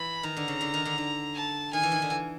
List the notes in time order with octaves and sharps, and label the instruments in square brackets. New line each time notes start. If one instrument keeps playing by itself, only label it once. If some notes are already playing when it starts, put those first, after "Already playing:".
Already playing: [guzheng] E3 [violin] B5
[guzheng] D#3 [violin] A#5
[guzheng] D3
C#3
D3
D#3
D3
D3
[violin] A5
[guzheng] D#3 [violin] G#5
[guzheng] E3
D#3
D3
E3